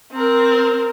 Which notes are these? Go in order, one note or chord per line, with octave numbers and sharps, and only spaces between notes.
C4 A#4